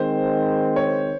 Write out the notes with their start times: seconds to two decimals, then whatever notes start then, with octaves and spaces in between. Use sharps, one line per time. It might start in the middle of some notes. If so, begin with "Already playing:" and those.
Already playing: D#3 G#3 C4 C5
0.76 C#5